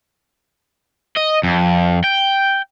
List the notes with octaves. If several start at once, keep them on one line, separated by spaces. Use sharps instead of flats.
D#5
F2
G5